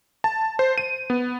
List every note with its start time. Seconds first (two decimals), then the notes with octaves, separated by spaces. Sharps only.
0.24 A5
0.59 C5
0.78 D#7
1.10 B3